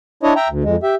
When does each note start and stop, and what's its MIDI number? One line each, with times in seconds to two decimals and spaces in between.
0.23 0.33 62
0.23 0.33 64
0.23 0.33 73
0.23 0.33 75
0.36 0.48 76
0.36 0.48 79
0.36 0.48 82
0.49 0.63 38
0.64 0.76 41
0.64 0.76 56
0.83 0.95 67
0.83 0.95 76